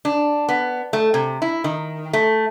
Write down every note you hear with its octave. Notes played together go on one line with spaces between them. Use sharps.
D4
B3
A3
C3
E4
D#3
A3